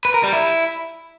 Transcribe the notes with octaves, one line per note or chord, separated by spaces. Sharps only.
B4
A#4
G3
E4